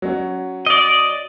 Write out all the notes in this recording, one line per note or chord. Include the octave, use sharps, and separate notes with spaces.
F#3 C#4
D5 D#5